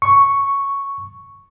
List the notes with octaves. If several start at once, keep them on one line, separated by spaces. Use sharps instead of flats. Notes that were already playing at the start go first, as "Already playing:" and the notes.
C#6